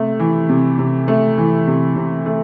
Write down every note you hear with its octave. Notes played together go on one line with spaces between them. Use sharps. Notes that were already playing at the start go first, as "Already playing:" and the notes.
Already playing: C3 A3
E3
C3
C3
A3
E3
C3
C3
A3